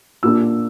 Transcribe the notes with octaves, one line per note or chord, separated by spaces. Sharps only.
A#2 A#3 D4 E6